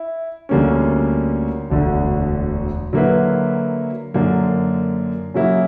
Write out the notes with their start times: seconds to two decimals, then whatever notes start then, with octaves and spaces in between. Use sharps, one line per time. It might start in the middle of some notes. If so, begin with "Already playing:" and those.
Already playing: E4
0.49 D2 D3 G3 A#3 C#4
1.70 E1 D2 D3
2.93 D3 F#3 A#3 E4 B4
4.14 F#2 D3 A#3
5.34 C#3 F#3 A#3 E4